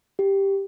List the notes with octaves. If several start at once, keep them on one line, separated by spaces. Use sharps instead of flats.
G4